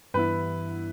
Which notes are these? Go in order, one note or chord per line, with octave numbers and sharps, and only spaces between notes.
G2 E3 B3 E4 B4